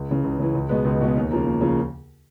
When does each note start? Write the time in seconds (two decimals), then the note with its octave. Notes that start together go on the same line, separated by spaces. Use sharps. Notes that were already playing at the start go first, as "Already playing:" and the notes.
Already playing: C#2
0.09 C#3 E3
0.24 C#2
0.39 C#3 E3
0.54 C#2
0.69 B2 G#3 B3
0.85 C#2
1.01 B2 G#3 B3
1.16 D#2
1.31 C#3 F3 A#3
1.46 D#2
1.61 C#3 F3 A#3